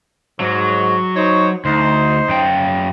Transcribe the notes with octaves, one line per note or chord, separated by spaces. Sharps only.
G#2 F#3
D#4 C5 C#5
D2 D#4 C5
F#2 G5